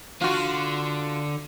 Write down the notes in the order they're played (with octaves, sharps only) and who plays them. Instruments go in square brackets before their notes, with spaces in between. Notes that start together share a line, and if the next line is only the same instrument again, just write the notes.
[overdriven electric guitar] D3 [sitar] F4 F#4